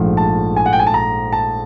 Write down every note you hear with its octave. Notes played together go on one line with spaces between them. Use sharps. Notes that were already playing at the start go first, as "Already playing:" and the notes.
Already playing: A#1 G#2 F3 A3
A5
G#5
F#5
G5
G#5
A5
A#5
A5